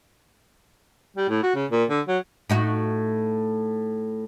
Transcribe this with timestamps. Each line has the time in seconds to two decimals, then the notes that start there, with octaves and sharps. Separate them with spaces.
1.16 G3
1.29 A2
1.43 F#4
1.55 C#3
1.71 A#2
1.90 D3
2.08 F#3
2.49 A2 D#4 F#4